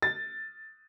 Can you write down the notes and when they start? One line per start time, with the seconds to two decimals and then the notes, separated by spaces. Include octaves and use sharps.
0.02 A6